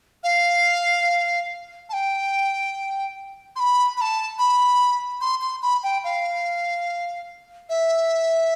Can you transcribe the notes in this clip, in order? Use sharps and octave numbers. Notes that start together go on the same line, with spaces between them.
F5
A5
G5
C6
B5
B5
A5
B5
C6
C6
B5
G5
F5
E5